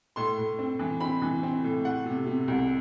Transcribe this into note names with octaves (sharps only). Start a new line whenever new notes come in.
A2 C6
A2
C4
E3
C4 B5
E3
C4
A2
A3 F#5
C3
C3
C2